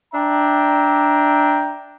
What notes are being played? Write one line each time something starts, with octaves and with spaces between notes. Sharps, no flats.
D4 E5 G5 A#5